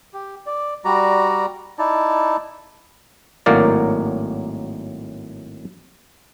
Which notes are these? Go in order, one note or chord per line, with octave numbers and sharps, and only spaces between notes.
G4
D5
G3 F#4 D5 A#5
D#4 E4 D5 A5
G#1 A2 F#3 A#3 A#4 D5